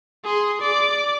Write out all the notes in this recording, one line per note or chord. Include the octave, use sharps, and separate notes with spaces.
G#4 C6
D5 D6